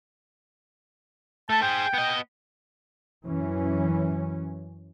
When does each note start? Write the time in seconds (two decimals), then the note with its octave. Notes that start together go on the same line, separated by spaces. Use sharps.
1.50 A3 A4 A5
1.62 G#4 C5 G5
1.94 B3 D#5
3.26 F#2 E3 C#4